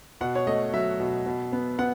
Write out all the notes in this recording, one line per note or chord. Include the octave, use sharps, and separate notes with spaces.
B2 F#5
C#5
A3 D#5
F#3 E5
B2
B2
B3
B3 F#5